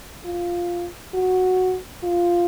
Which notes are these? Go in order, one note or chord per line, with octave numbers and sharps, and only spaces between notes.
F4
F#4
F4